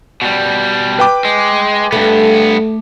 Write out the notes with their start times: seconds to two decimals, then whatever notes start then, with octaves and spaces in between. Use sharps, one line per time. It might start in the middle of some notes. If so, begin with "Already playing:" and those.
0.22 B2 G3
0.99 B4 G5 D6
1.25 G#3
1.92 G2 A3 B3